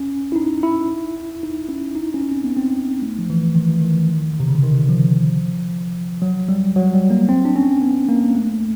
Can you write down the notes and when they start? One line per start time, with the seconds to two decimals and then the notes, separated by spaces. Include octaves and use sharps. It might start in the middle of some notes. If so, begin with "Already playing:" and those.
Already playing: C#4
0.32 E4
0.36 D#4
0.63 E4
1.43 D#4
1.69 C#4
1.95 D#4
2.14 C#4
2.32 C4
2.44 B3
2.57 C4
3.02 A3
3.19 F3
3.30 E3
3.55 D#3
3.69 E3
3.81 D#3
4.40 C3
4.48 C#3
4.55 D3
4.63 D#3
4.89 F3
6.22 F#3
6.49 G3
6.76 F#3
6.93 G3
7.10 A#3
7.29 C4
7.45 D4
7.56 C#4
7.82 B3
8.09 A#3
8.35 A3